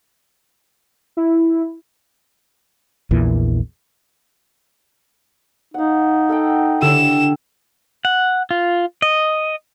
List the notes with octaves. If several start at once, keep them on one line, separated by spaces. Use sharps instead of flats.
E4
A#1 E2 A#2 E3
D#4 F5 F#5
A4 F#5 G5
D3 E4 G4 A4 E7
F#5
F4
D#5